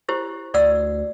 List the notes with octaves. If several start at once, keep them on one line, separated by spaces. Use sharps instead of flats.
E4 G4 C5
D2 D5 F#5 E6